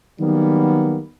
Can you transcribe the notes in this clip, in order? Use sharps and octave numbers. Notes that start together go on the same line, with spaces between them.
D#3 F#3 G3 A#3 B3